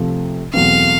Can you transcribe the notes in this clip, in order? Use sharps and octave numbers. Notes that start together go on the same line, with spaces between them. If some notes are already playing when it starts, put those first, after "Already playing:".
Already playing: C3 F3 A3
E2 B2 F#3 A3 C4 F5